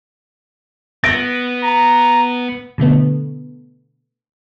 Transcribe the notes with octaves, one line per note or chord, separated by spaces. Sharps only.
B3 A#6 D7
A#5
B2 D3 A3 B3